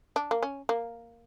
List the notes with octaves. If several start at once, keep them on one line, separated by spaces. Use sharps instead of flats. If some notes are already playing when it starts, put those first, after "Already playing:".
D4
A#3
C#4
A#3